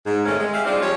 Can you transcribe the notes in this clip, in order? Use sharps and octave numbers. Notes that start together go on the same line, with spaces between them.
G#2
C3 D#3 A3 C#4
G#3
G4 G#4 E5 F5
G3 G#3 C4 D4 D#4 F4
F3 G3 G#4 C#5